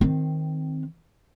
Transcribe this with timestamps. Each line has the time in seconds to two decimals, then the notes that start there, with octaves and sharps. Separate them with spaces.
0.01 D#3 C4